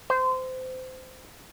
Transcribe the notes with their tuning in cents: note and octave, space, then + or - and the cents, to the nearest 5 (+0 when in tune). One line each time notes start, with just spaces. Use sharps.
C5 -25